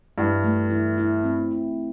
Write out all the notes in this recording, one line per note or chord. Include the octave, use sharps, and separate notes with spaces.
G2 E4
A3
E4
E4
C4
E4